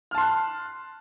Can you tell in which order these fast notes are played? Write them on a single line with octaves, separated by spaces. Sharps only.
F6 A5 C6 F#6